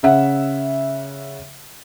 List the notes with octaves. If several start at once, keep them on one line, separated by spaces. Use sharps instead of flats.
C#3 E5 F#5